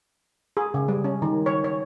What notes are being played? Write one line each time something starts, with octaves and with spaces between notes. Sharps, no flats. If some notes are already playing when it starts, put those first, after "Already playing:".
G#4
C#3
G3
C#4
D#3
C#5
C#5